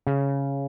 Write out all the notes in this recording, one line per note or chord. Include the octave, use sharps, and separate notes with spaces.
C#3